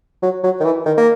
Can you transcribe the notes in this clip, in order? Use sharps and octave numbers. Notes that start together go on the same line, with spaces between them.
F#3
F#3
D#3
E3
D#3
A#3